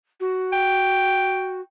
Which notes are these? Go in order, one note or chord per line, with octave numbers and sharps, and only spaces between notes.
F#4
G5